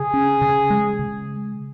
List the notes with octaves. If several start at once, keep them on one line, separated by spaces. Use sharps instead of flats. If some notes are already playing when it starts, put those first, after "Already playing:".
Already playing: C#3 G#4
C#4
C#3
G#3
C#3